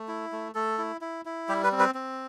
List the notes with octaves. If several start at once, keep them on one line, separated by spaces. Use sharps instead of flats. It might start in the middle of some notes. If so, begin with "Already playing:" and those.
Already playing: A3
E4
A3
A3 A4
E4
E4
E4
G3 G4
B4
C4
B4
C4